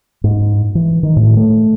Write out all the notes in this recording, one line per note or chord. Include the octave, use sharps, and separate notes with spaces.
G#2
E3
D#3
A2
A3